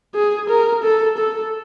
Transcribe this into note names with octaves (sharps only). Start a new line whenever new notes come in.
G#4
A#4
A4
A4